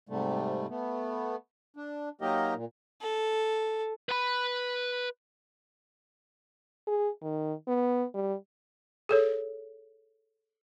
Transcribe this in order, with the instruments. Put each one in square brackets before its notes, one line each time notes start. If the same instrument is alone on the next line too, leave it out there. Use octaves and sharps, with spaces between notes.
[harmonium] G#2 C3 G3 A3
A3 B3
D4
F#3 A#3 D#4 G4 A#4 D#5
A#2
[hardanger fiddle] A4
[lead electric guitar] B4 B5
[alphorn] G#4
D#3
B3
G3
[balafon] G#4 A4 C#5